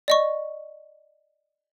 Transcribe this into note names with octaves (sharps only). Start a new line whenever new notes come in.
D5 D#5 C#6